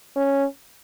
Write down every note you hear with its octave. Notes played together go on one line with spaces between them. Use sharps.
C#4